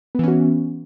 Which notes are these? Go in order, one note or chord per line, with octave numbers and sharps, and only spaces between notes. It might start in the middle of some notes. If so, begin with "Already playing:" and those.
E3 B3 C#4 F#4